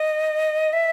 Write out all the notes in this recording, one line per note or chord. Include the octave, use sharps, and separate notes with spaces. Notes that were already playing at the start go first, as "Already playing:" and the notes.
Already playing: D#5
E5